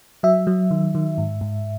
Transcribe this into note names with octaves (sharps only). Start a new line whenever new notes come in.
F#3 E5
F#3
D#3
D#3
G#2
G#2